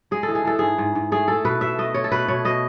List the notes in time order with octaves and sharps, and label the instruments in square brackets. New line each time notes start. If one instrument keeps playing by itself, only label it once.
[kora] G#3 G#4
A4
E3
G#4
E3 A4
G#2 G#4
G#2
G#2
A3 G#4
A3 A4
B2 B4
B2 E5
A3 D#5
A3 C#5
A4
B2 B4
B2 C#5
B2 D#5